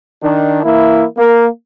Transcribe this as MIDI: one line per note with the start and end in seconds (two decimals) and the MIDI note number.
0.23 0.63 51
0.23 0.63 62
0.64 1.04 52
0.64 1.04 58
0.64 1.04 64
1.18 1.47 58